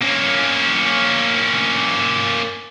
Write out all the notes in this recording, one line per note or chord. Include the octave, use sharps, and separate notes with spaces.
A#3 C#4